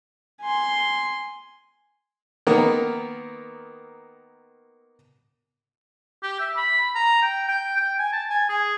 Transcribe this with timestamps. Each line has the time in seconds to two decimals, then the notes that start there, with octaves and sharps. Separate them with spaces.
0.41 G#5 C6
2.47 D#3 A#3 B3
6.23 G4
6.39 E5
6.57 B5
6.95 A#5
7.22 G5
7.48 G5
7.77 G5
7.99 G#5
8.13 A5
8.29 G#5
8.49 G#4